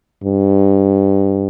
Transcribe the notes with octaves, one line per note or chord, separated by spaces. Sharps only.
G2